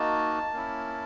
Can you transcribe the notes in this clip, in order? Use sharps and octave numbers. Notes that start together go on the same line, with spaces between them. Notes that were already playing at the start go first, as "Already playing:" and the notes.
Already playing: A#3 D#4 F#4 A5
A#3 C#4 E4